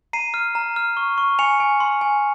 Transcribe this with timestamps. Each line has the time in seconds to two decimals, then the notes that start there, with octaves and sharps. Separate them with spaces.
0.13 A#5 C7 D#7
0.34 F6
0.55 A#5
0.76 F6
0.97 C#6
1.18 C#6
1.39 G#5 C#7 F7
1.60 G#5
1.80 C6
2.01 G#5